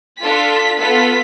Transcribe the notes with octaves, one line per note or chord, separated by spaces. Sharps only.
D4 F4 A4 B6
B3 F4 A4 B6